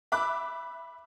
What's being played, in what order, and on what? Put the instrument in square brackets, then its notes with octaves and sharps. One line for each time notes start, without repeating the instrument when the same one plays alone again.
[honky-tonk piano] E5 B5 D6 F#6